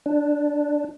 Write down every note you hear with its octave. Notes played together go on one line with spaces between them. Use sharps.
D4